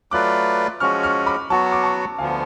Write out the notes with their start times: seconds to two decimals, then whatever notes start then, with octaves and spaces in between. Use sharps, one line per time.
0.11 F#3 A3 F4 B4 D5 D6 F#6
0.80 F3 G#3 C#4 F#4 C#6 F6
1.03 C#6 F6
1.26 B5 D6
1.50 F#3 B3 F#4 A5 C#6
1.72 D6
1.84 A5 C#6
2.18 D2 D3 F3 B3 F5 G#5